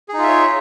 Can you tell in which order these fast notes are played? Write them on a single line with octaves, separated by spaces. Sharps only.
G#4 D#4 F4 E5 C#5